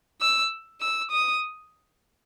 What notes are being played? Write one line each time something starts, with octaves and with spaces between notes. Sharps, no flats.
E6
E6
D#6